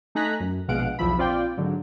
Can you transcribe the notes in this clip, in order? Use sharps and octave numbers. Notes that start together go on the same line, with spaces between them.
A3 D#4 G#5 A#5 F#6 B6
F#2
A#1 B2 G#3 F5 F#5 D7
B1 E2 F3 E5 B5
A#1 C4 F4 D5 G5
G#2 D3 F#3